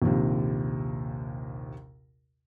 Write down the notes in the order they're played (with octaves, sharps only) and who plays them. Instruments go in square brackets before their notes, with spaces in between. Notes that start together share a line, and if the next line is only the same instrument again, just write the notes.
[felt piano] A#1 D#2 C3